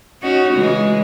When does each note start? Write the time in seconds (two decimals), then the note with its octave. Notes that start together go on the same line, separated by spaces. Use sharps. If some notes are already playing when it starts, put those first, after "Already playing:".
0.22 C#4 D#4 F#4
0.54 C#3 E3 G#3